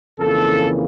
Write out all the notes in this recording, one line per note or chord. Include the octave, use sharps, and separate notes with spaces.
F2 C#3 E3 A#3 A4